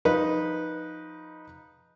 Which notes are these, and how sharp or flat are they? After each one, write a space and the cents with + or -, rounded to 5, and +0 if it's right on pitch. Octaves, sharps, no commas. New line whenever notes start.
F3 +0 D#4 +0 B4 -15